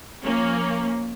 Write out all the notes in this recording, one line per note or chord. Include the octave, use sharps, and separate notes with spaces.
F3 A#3 C#4